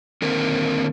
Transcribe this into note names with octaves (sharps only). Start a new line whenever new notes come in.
D3 D#3 A#3 C4 A#4